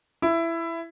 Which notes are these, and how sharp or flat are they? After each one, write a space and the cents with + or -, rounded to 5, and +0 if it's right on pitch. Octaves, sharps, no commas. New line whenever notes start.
E4 +15